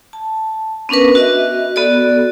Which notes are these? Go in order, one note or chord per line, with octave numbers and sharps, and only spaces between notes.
A5
B3 C#4 D4 A#4 B4
F#4 D#5 E5
B3 F#4 A4 D5